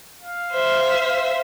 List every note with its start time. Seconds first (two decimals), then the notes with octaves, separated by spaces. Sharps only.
0.22 F5
0.51 C5 E5